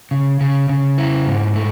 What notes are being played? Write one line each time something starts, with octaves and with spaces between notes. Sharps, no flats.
C#3
C#3
C#3
E4
G#2
A3